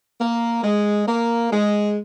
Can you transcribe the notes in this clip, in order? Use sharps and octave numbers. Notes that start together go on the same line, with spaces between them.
A#3
G#3
A#3
G#3